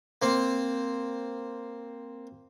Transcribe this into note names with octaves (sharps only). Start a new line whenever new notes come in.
A#3 C4